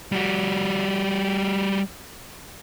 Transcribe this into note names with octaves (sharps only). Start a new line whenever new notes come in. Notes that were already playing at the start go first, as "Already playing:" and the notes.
G3 F#4